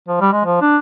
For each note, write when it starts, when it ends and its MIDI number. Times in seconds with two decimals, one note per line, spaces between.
0.08 0.19 53
0.21 0.30 55
0.33 0.44 56
0.45 0.60 53
0.61 0.78 62